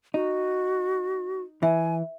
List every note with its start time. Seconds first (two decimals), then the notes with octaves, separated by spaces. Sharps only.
0.14 D#4 F#4
1.63 E3 E5 G#5